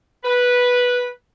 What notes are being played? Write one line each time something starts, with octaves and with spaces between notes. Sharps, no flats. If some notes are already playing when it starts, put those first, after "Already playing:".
B4